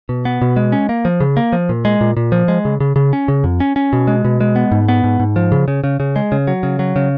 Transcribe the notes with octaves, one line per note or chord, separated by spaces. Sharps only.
B2
B3
B2
G#3
C#4
A#3
F3
C#3
A#3
F3
A#2
G#3
A#2
A#2
F3
G#3
C#3
C#3
C#3
C#4
C#3
F2
C#4
C#4
B2
G#3
B2
G#3
B3
G#2
B3
G#2
G#2
F3
C#3
C#3
C#3
C#3
G#3
C#3
F#3
C#3
F#3
C#3